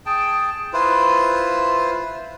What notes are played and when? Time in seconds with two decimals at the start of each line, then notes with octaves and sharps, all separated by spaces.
0.06 G#4 G5 A5
0.73 E4 F4 B4 C5